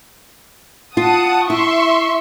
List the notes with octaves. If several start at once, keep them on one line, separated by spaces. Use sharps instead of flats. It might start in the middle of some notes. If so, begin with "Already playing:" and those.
F4 F#5 A5 D#6
E4 E5 C6 C#6